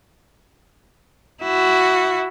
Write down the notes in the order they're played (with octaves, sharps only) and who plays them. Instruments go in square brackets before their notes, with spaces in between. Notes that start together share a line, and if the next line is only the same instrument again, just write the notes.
[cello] E4 F#4